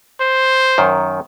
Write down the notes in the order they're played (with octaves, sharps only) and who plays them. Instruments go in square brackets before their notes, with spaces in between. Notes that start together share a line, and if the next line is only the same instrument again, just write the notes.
[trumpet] C5
[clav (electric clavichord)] F#2 D#3